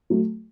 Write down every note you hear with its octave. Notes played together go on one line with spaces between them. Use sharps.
F#3 A3